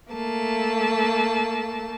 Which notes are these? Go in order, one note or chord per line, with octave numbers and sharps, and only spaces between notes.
A3 A#3 A5